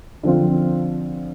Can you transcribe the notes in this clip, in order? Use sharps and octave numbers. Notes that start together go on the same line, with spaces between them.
D3 F3 C4 F4